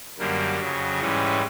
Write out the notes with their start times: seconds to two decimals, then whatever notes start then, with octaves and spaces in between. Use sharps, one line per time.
0.19 F#2 D3 G3 A#3
0.60 F2 C#3 F#3
1.01 G#2 E3 G3 C#4